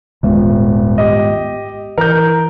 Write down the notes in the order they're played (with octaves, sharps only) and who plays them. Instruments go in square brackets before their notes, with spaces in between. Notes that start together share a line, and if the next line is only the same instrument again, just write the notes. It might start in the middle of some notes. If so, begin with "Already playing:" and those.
[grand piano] D#1 [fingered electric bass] G#1 G#3 B3
[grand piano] G4 D#5
[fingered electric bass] E3 [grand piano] A#4 G6